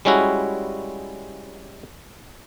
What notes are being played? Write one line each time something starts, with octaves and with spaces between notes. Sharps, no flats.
G3 G#3 C#4 E4 F#4